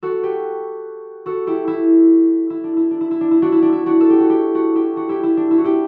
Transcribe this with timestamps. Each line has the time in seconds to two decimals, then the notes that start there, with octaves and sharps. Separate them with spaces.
0.03 F#4 A4
0.23 G4 B4
1.26 F#4 A4
1.47 E4 G4
1.68 E4
2.50 E4
2.64 D4
2.77 E4
2.91 D4
3.01 E4
3.11 E4
3.21 D4
3.31 E4
3.42 D4 F#4
3.52 E4
3.62 D4
3.73 E4
3.86 D4 F#4
4.01 A4
4.10 G4
4.20 F#4
4.29 E4 G4
4.55 D4 F#4
4.75 E4 G4
4.96 D4 F#4
5.09 E4 G4
5.23 E4
5.37 D4
5.51 E4
5.58 F#4
5.64 E4 G4